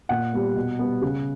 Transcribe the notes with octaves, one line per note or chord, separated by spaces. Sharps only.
A#2 F#5
G3 B3
B2
G3 B3
C#3